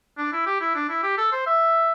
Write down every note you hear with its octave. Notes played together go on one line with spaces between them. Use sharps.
D4
E4
G4
E4
D4
E4
G4
A4
C5
E5